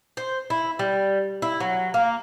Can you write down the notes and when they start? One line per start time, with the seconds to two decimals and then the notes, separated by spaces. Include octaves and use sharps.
0.17 C5
0.50 E4
0.79 G3
1.42 E4
1.60 F#3
1.94 A#3